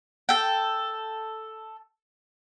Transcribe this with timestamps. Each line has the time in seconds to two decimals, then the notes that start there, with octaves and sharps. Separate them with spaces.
0.29 A4 G5